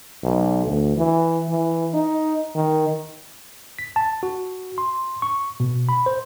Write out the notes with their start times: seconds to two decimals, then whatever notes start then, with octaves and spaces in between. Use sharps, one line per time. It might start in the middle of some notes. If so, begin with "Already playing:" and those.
0.24 B1
0.66 D2
0.97 E3
1.49 E3
1.94 D#4
2.55 D#3
3.79 B6
3.96 A5
4.23 F#4
4.78 C6
5.22 C#6
5.60 B2
5.89 B5
6.06 C5